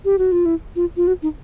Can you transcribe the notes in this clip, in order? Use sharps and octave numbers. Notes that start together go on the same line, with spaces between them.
G4
F#4
F4
E4
F4
F4
F#4
D#4